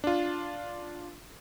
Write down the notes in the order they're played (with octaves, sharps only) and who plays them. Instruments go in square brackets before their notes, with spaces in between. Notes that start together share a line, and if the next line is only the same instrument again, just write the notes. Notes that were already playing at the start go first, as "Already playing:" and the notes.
[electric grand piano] D4 F4